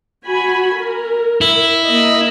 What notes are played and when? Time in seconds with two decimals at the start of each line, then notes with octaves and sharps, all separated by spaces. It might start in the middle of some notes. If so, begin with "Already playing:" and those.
0.25 F#4 G#5 B5
0.77 A#4
1.41 E4
1.87 A#3 A#4 D#5